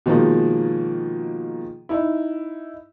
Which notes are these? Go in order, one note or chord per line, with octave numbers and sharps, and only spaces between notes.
B2 D#3 F3 G#3 A#3
D#4 E4